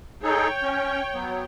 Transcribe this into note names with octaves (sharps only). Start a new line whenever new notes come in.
D#4 G#4 A4 C#5 G5
C#4
F#3 B3